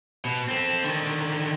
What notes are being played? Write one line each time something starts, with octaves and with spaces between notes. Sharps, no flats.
B2
C4 A4
D3 D#3